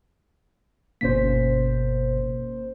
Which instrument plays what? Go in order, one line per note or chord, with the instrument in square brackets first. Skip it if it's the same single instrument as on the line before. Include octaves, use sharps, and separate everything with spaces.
[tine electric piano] G1 B2 B6 [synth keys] A#3 C#4 C5